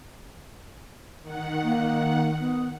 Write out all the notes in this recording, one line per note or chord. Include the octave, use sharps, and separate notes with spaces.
D#3 F#5
A#3
B3